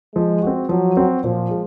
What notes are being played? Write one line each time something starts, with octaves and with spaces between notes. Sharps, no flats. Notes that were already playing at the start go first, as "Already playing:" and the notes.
F3 G#3
C4 F#4
F3 F#3
C4 F#4
A#2 F3
G#3